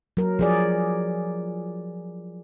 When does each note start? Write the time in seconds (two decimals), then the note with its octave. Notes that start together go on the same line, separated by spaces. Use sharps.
0.17 F#3 A#4
0.39 F3 G#4 D5